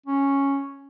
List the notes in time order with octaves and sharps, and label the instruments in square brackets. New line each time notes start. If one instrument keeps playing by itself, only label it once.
[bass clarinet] C#4